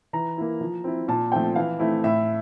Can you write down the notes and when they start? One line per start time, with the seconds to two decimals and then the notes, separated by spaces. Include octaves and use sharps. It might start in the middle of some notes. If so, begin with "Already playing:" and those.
0.13 E3 A#5
0.37 A#3 E4
0.61 F3
0.84 C4 E4
1.08 A#2 A5
1.32 F3 A3 C4 G5
1.56 E3 F5
1.79 A3 C4 E4
2.04 A2 E5